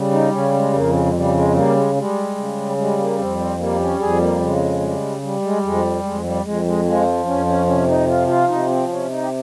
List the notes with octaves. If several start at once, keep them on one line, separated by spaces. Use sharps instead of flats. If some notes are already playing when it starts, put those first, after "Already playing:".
Already playing: C#3 G3
D#4
C#3 C#4
G#3
F2 A#3
G#3
G#3
C#3 G3
G#3
G3 A#3
G#3
G3 G#3
C#3
G3 G#3
A#3
F2 C4
C4
G3 A#3
C#4
F2 G#4
A#3
C#3 G#3
G3
G3
G#3
F2 G#3
F2 G#3
G3
F2 G#3
G#3
F3 G#3
F2 C#4
C#4
C3 C#4
D#4
F3 F4
F4
C3 D#4
C4
C3 C#4
D#4
G4